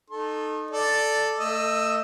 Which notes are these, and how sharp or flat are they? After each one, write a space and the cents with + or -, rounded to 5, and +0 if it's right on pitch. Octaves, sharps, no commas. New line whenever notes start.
D#4 -20 A4 -5 C6 +45
A4 +0 D5 +0
A3 +30 D#5 -10 E6 +0